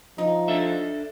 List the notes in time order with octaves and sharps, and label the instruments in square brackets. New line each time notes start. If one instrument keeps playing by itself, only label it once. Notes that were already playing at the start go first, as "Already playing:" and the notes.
[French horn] F3 [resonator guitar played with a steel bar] D#4
[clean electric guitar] D4 A4 E5